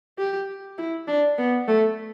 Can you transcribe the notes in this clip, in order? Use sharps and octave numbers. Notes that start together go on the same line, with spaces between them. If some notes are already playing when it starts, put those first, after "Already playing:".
G4
E4
D4
B3
A3